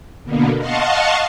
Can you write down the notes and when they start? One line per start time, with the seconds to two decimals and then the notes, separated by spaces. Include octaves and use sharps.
0.24 B2 D3 A#3 B3
0.57 D#5 F5 F#5 A5 C6 C#6